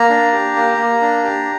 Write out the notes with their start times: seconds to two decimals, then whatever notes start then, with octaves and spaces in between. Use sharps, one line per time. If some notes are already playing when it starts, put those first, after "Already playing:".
Already playing: A#3 A#5
0.10 D4
0.32 G4
0.56 A#3
0.78 A#3
1.01 D4
1.24 G4